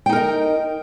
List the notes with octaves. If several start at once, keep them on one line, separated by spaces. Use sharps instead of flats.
D#4 A#4 D#5 G5